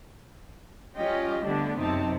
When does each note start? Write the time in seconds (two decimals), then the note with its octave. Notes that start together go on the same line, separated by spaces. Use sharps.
0.96 G3 C#4 F4 G4 D#5
1.45 D3 G3 A3 B3 D4
1.78 F#2 C3 C4 D#4 A5